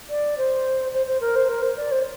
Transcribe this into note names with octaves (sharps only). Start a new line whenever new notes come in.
D5
C5
C5
C5
A#4
C5
A#4
C5
D5
C5